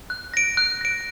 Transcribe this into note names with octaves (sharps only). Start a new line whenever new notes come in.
F#6
A#6 D7
F#6
A#6 D7